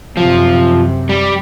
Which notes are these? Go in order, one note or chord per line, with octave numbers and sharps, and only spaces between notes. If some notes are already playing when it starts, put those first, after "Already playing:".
F#2 C3 F3
G3